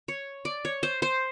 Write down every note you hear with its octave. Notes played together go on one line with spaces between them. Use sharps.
C#5
D5
C#5
C5
C5